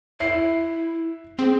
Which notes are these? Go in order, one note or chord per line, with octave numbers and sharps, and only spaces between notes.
E4 E5 C7
C4 G#4